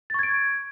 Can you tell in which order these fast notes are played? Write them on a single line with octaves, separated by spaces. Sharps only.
A6 C#6 G#6 D7